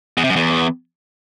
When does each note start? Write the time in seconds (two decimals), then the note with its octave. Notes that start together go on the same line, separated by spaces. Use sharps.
0.17 E2
0.24 C3
0.30 F#2
0.36 E2